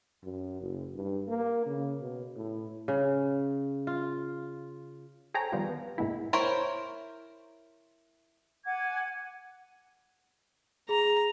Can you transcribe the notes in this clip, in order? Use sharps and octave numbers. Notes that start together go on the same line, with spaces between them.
F#2
F#1
G2
A#3
C#3
B2
A2
C#3
F4
G#4 A4 C5 C#5 G5 A#5
D#3 F3 G3 B3 F4
B3
G#2 C3 G#3 A#3 B3 E4
E4 A#4 C5 C#5
F#5 G#5 D6 G#6
G#4 A#5